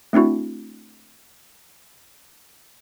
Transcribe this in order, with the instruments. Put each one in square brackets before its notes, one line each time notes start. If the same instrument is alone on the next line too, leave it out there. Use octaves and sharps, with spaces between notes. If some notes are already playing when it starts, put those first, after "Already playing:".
[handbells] A3 C4 D4 E4 F#4